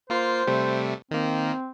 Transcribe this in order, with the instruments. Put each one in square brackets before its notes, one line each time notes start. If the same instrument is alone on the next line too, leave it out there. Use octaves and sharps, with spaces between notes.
[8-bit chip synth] A#3 F4 C7 [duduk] C5
[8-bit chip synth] C3 G3 A3
[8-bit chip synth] D#3 A#3 [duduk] C4